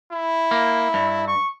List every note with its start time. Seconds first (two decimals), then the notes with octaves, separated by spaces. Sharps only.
0.11 E4
0.51 A#3
0.94 G2
1.28 C#6